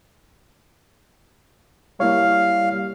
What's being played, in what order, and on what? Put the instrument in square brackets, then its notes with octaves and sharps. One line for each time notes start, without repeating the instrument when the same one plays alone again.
[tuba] G3 [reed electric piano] A#3 E4 C#5 [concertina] F5